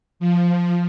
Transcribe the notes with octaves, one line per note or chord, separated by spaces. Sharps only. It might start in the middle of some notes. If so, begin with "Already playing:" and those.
F3